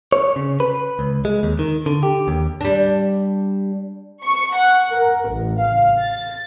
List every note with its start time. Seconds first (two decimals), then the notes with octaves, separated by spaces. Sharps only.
0.12 C#5
0.36 C#3
0.60 B4
0.99 C#2
1.25 G#3
1.43 D#2
1.59 D#3
1.86 D3
2.03 G4
2.28 D#2
2.61 G3 D4
4.24 C#6
4.56 F#5
4.92 A#4
5.30 A1
5.61 F5
6.01 A6